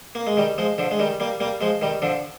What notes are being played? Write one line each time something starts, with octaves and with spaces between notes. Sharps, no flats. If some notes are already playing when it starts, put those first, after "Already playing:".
A#3
G#3
D#3 G3
F3 G#3
D3 F3
G#3
D#3 G3
G3 A#3
G3 A#3
F3 G#3
D#3 G3
D3 F3